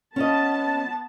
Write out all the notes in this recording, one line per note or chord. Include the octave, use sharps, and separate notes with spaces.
B3 C#4 F4 D#5 A5